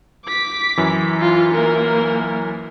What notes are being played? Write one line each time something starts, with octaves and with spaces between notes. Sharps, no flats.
D6 B6
F#2 E3
F4
A#3 A#4